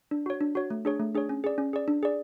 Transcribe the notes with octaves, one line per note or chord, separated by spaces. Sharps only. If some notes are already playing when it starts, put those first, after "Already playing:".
D4
F#4 C#5
D4
F#4 C#5
A3
D4 G#4 C#5
A3
D4 G#4 C#5
C#4
G#4 D5
C#4
G#4 D5
D4
G#4 D5